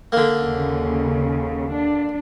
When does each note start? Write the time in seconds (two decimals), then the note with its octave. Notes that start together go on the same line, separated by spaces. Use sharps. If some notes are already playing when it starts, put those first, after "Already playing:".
0.12 D3 A#3
0.42 D#2 C#3
1.68 D4